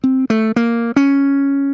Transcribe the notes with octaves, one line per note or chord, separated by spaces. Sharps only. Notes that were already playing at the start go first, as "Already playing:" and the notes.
C4
A3
A#3
C#4